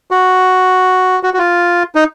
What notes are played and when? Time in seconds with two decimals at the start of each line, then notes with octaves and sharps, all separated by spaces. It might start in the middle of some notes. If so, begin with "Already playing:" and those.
0.11 F#4
1.23 F#4
1.34 F#4
1.39 F4
1.95 D#4